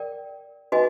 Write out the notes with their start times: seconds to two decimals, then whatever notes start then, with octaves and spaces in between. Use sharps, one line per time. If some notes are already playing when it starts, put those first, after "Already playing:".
Already playing: A#4 D5 G5
0.72 D#4 F#4 B4 D#5 G#5